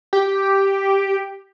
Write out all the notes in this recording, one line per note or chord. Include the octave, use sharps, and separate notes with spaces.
G4